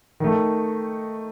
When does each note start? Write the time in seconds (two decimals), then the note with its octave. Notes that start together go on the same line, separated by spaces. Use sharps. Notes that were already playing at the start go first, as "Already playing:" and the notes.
0.20 D#3 A3